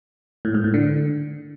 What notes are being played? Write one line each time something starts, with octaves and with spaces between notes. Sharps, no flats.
A2
G#2
A2
D3